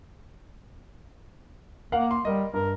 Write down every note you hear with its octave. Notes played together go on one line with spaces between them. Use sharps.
A#3 A#4 F5 F#5
C6
G3 A#4 D#5
G2 A#4